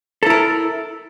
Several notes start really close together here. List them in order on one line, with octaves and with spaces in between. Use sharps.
A4 E4 A#4